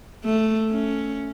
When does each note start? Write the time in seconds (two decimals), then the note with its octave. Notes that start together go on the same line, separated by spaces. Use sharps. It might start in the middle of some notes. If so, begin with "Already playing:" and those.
0.25 A3
0.71 C#4